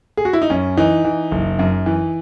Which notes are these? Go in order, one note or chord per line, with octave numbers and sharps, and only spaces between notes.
G#4
F#4
E4
D#4
F#2 C#4
E3 D#4
E3
F#1
F#2
E3